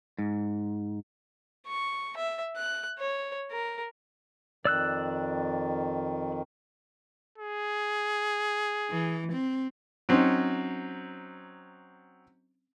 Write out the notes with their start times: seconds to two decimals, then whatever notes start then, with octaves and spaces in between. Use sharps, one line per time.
0.19 G#2
1.67 C#6
2.17 E5
2.56 F#6
2.99 C#5
3.51 A#4
4.65 F2 D#3 D5 E6 F#6
7.38 G#4
8.91 E3
9.33 C4
10.09 F#3 C4 C#4 D#4